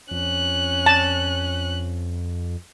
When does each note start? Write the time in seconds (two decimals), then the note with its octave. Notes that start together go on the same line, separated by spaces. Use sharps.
0.11 F2 C#4 F#6
0.86 A5